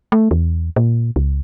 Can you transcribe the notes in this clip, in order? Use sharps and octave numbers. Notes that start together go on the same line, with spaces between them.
A3
E2
A#2
C#2